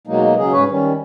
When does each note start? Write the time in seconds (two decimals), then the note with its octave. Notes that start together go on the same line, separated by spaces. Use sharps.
0.07 B2 F#3 G#3 A#3 D#4
0.37 C#3 F#3 G#4
0.52 G#2 C#4 B4 C#5
0.69 D#3 G3 C#4